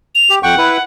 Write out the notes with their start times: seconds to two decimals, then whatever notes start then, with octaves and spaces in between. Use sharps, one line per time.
0.15 F7
0.30 G4
0.43 F2 F#5 G5 C#6
0.58 E4 B4